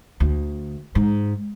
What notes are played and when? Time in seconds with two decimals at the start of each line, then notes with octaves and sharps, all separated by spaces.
0.20 D2
0.95 G#2